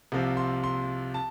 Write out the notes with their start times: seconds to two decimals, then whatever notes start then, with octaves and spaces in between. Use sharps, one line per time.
0.12 C2 C3 F3 C4
0.37 C6
0.64 C6
1.14 A5